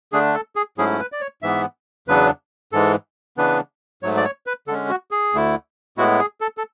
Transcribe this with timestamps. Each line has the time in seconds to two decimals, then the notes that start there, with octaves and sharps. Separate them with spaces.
0.12 D3 A3 D4 G#4
0.34 A4
0.56 G#4
0.78 G#2 F#3 A3 C#4 E4 G#4
1.00 B4
1.12 D5
1.21 C#5
1.43 G#2 E3 B3 E5
2.08 E2 C#3 F#3 B3 D4 B4
2.73 G#2 E3 G#3 A4
3.37 C#3 E3 B3 D4 B4
4.03 G#2 F#3 A3 C#5
4.17 D5
4.24 C#5
4.47 B4
4.68 D3 A4
4.70 G#3 C#4
4.89 F#4
5.11 G#4
5.33 D2 D3 A3 E4
5.98 A2 G#3 B3 E4 F#4
6.20 G#4
6.41 A4
6.58 A4